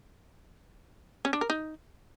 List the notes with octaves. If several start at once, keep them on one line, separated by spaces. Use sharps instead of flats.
C#4
D4
A#4
D#4